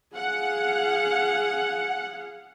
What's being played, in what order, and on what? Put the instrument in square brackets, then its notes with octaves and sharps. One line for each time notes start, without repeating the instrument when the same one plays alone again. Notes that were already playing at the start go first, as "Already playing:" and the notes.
[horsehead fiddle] G#4 F5 [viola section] F#5